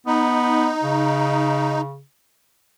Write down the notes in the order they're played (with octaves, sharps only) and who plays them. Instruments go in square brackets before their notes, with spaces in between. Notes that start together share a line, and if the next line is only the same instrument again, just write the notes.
[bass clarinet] B3 [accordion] D#4
[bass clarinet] C#3